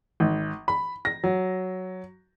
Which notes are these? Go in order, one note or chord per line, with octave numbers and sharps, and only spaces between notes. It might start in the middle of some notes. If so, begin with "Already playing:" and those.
G#1
B5
A#6
F#3